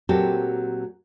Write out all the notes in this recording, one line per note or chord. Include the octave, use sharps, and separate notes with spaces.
A#2 F#3 C4 F#4 G4 A4